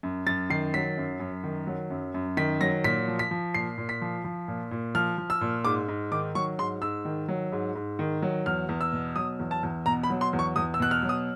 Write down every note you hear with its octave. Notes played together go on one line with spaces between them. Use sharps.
F#2
F#2 A6
D#3 C7
F#3 B6
F#2
F#2
D#3
F#3
F#2
F#2
D#3 B6
F#3 A#6
A#2 B6
F3
B6
F3
A#2 C7
A#2
B6
F3
F3
A#2
A#2
F3 F6
F3
E6
A#2
G#2 D6
G#2
D#3 D6
F#3 C#6
G#2 C6
G#2 E6
D#3
F#3
G#2
G#2
D#3
F#3
E2 F6
E2
E6
B2
F#3 D#6
E2
A5
E2
B2 A#5
B5
F#3
C6
E2
C#6
E2 D#6
E6
B2 F#6
F6
F#3
D#6